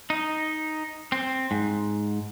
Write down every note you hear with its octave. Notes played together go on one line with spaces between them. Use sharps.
D#4
C4
G#2